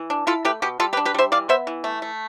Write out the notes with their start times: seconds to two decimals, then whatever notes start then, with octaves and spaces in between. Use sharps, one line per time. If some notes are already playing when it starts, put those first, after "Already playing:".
Already playing: E3
0.10 D4
0.27 E4 F4 A4
0.45 A3 G4 B4
0.62 B2 G4
0.80 G3 F4 A4
0.93 G4 B4
0.97 D4
1.05 G4 B4
1.14 G3 C5 E5
1.32 E3 D5 F5
1.49 B3 C5 E5
1.67 E3
1.84 A3
2.02 A3